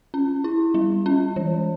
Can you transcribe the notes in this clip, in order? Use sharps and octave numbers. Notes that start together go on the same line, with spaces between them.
C#4
E4
G3
C#4
E3